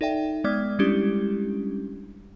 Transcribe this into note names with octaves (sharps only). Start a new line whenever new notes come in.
D#4 A4 D5 E5 G5
G#3 B3 D5 D6 F6 G#6
G3 G#3 C#4 D4 E4 G4